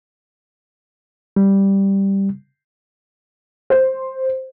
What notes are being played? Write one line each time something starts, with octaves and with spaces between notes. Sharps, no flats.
G3
C5